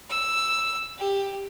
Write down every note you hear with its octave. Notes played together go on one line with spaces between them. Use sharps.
E6
G4